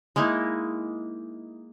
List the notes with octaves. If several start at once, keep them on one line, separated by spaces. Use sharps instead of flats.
G#3 A#3 D#4 E4